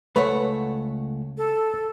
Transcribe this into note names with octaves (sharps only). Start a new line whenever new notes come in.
C#2 A3 B4 C#5 F#5
A4